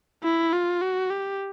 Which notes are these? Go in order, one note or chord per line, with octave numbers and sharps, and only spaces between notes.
E4
F4
F#4
G4